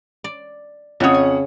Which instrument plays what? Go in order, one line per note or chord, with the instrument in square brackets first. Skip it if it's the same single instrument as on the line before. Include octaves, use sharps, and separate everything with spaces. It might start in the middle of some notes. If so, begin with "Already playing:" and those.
[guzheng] D5
[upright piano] F2 F#5 D#6 [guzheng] C#3 C#5
[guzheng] G#5